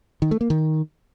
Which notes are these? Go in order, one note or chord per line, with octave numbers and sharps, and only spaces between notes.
D#3
A3
A#3
D#3